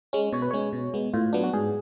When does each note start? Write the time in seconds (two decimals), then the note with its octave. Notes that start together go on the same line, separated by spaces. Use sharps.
0.13 G#3 C#4
0.33 B2 C#5
0.42 B4
0.51 G#3 C#4 C#5
0.73 B2
0.94 G#3 B3
1.13 A2 F4
1.33 F#3 B3 D4
1.44 F#4
1.53 G#2 G#4